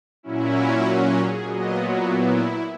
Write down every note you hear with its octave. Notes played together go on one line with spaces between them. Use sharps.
A#2 F#3 C#4 E4
F#4
G#4
A#2 F#3 B3 D#5
F#4
E4